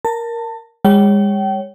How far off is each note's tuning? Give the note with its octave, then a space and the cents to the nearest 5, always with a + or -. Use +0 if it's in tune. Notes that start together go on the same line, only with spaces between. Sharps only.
A#4 +0 A5 +25
G#3 -40 C#5 +0 G5 -35